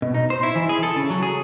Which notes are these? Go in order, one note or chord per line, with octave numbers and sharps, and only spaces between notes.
B2
D#4
C5
E4
E3
G#4
A4
C#3
F#3
G#4